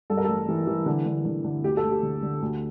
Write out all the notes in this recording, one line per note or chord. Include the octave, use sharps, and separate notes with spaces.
G2 A4
A#4
A1 A4
E3
E3
D3
D3
D3
D3
D2 G4
A4
D2
G4
D3
D3
D2